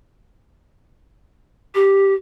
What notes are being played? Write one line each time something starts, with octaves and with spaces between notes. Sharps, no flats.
G4